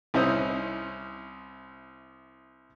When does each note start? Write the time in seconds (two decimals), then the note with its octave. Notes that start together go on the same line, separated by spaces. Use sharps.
0.14 C2 C#4 D#4 E4 C5 D#6